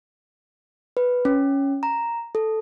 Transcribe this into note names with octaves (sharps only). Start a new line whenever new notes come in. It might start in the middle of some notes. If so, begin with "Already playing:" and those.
B4
C#4
A#5
A4